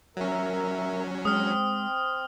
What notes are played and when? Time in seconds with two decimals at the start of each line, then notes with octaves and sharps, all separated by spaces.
0.17 F#3 C#4 A#4 E5
1.25 G#3 C4 D#6 F6